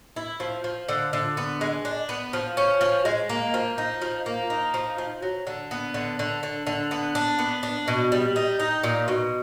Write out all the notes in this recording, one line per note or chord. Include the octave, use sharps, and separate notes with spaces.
E4
F3
F3
D3
D3
B3
G#3
D4
B3
F3
C#4
F3
G#3
A#3
F3
D#4
F3
A#3
D#4
F3
F3
F#3
D3
B3
D3
D3
D3
D3
B3
D4
B3
D4
B2
G3
D#4
D#4
A#2
B2